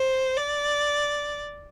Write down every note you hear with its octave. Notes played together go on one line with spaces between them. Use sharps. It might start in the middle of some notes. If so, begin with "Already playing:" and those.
Already playing: C5
D5